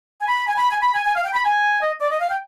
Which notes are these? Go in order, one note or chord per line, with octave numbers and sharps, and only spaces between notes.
G#5
B5
G#5
B5
G#5
B5
G#5
G#5
F5
G5
B5
G#5
D#5
D5
D#5
F5
G5